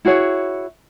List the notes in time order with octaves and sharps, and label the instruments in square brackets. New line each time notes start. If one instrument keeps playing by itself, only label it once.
[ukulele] E4 F#4 G#4 C#5